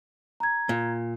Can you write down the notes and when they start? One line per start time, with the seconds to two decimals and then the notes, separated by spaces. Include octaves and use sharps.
0.40 A#5 G#6
0.69 A#2